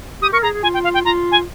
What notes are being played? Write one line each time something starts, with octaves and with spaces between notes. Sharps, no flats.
G4 D#6
A#4 C#6
G#4 A#5
G#4
F4 G#5
G5
F5
G5
F4 A#5
G#5